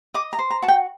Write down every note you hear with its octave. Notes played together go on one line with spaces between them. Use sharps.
D#5 D6
A#5
C5
A#5
F#4 A5
G5